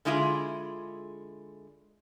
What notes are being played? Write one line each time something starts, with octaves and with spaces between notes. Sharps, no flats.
D3 G#3 E4 F4 G#4